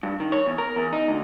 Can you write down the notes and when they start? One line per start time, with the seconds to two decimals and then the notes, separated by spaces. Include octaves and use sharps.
0.03 G2
0.20 D#3
0.32 C#5
0.46 E2
0.58 A#4
0.76 E2
0.93 D#4
1.08 D2